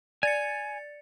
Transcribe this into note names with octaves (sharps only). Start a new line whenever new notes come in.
D5 G#5 A6 C#7